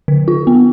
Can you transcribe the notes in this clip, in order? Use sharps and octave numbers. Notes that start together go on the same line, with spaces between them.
D3
F4
B3